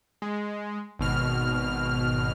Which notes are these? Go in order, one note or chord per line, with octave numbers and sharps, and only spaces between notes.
G#3
G#1 B2 F6